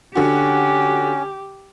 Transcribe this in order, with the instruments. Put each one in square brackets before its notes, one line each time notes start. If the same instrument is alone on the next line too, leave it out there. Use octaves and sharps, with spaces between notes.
[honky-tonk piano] D3 F#4 [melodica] C#4 [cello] G4